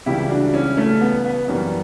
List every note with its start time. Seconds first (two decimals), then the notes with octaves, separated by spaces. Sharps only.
0.06 C#2 C#3 E3 G3 E4 G4
0.30 D4 F#4
0.54 C#4 E4
0.77 A3 C#4
1.01 B3
1.25 B3
1.48 F#2 E3 G3